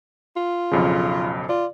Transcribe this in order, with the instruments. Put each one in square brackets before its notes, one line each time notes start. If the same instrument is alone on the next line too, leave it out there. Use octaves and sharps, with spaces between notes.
[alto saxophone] F4
[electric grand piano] B1 F2 C#3
[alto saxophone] F4 [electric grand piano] D5